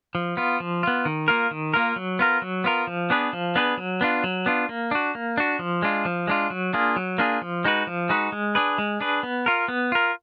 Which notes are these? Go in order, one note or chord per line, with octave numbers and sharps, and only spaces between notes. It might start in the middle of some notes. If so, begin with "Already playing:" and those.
F3
B3 F4
F3
B3 F4
D#3
A#3 F4 A#4
D#3
A#3 F4 A#4
F#3
B3 F4 A#4
F#3
B3 F4 A#4
F3
B3 D4 G#4 B4
F3
B3 D4 G#4 B4
F#3
B3 D4 F4
F#3
B3 D4 F4
A#3
D4 F#4
A#3
D4 F#4
F3
G#3 D4 F4
F3
G#3 D4 F4
F#3
A#3 D4 F4 G#4
F#3
A#3 D4 F4 G#4
F3
G#3 D#4 F#4 B4
F3
G#3 D#4 F#4 B4
G#3
D4 G#4 B4
G#3
D4 G#4 B4
B3
F4 A#4
B3
F4 A#4